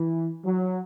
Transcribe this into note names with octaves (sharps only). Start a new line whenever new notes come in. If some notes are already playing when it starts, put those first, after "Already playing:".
Already playing: E3
F#3